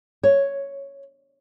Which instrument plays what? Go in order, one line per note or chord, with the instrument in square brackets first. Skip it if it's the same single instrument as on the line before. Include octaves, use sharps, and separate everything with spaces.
[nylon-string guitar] C#5